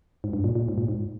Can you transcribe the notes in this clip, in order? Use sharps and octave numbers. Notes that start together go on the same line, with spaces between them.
G#2
G2
A#2
A#2
G#2
A#2
G#2